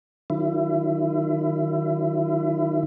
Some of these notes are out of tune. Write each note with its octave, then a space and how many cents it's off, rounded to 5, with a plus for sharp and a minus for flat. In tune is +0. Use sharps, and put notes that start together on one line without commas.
D#3 -15 F#3 +0 E4 +30